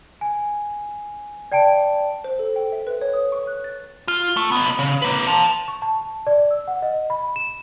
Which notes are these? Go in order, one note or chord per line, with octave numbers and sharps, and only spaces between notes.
G#5
D5 G5 A5 D7
C5
A4
G5
E5
B4
C#5
D#6
C#6
F#6
A6
F4
A3
B1 B3
C#3
A#3 B4
A5 C6
C#6
A5
A5
D5
E6
F#5
D#5
B5
E7